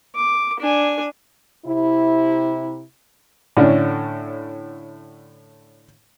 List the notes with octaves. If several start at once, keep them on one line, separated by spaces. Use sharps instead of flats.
D6
D4 G#5
C3 E4
A2 D3 C#4 D4